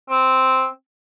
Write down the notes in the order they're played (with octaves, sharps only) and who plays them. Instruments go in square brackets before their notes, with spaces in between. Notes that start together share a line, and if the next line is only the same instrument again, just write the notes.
[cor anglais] C4